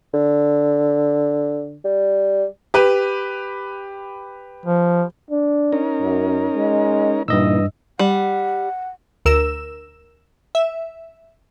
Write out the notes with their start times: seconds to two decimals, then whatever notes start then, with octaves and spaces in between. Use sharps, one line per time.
0.13 D3
1.84 G3
2.74 G4 B4
4.66 F3
5.30 D4
5.72 C#4 D#4 A#4
6.02 F#2
6.55 G#3
7.28 G2 A#2 E3 D#4 D#5 E6
7.99 G3 F#5
9.25 D2 A#4 E6 E7
10.55 E5